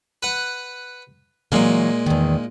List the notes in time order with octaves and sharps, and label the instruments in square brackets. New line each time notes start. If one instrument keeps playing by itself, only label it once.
[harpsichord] B4 F#5
[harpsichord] A#2 G#3 A#3 [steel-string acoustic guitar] D3 E3 F#3
[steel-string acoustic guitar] E2 D#3